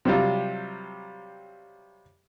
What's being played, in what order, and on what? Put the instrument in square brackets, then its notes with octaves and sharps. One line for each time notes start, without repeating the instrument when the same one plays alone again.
[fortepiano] C3 F#3 G3 F4